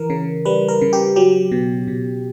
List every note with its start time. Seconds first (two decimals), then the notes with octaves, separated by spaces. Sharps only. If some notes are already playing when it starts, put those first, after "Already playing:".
Already playing: E3 A#4
0.10 C#3
0.45 G3 B4
0.68 A#4
0.81 C#3
0.93 G4
1.16 F#3 G4
1.52 B2
1.88 B2